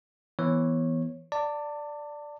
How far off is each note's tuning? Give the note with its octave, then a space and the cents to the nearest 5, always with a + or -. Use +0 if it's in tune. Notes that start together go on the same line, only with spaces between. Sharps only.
E3 +0 B3 -15 C#5 -20
D5 +0 A5 +30